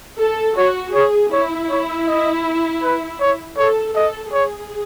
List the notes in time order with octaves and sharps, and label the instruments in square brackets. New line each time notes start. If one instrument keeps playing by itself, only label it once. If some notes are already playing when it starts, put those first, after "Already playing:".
[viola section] A4
[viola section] F#4 [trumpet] C#5
[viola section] G#4 [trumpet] C#5
[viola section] E4 [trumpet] C#5
[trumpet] C#5
D#5
B4
C#5
[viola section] A4 [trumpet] C#5
[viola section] A4 [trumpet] D#5
[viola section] G#4 [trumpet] C#5